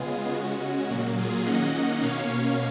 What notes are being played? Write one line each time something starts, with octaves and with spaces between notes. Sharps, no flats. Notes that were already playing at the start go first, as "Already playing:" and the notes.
Already playing: C#3 G#3 B3 F4 G#4
C#3 G#3 C#4 F#4
A#2 F#3 A#3 F#4
F4 G#4
D#3 A#3 C#4 D#5 F#5
B2 A#3 C#4 C#5 F5